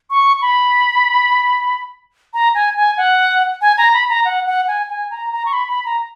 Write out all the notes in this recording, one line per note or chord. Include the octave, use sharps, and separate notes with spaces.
C#6
B5
A#5
G#5
G#5
F#5
G#5
A#5
B5
A#5
F#5
F#5
G#5
G#5
A#5
A#5
C#6
B5
B5
A#5